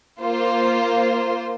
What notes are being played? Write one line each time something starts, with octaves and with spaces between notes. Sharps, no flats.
A#3 F4 C5